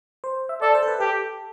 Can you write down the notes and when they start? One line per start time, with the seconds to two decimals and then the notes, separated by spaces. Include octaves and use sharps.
0.24 C5
0.49 E5
0.62 A4 D5
0.75 C5
0.83 A4
0.88 B4
1.00 G4 A4